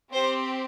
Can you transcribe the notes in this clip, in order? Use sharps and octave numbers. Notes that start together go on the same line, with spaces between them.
C4 G4 C5